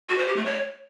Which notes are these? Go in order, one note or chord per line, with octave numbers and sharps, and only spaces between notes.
F#4
C5
G4
A3
C#5